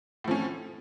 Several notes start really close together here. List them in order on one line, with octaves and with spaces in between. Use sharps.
A2 F3 C#4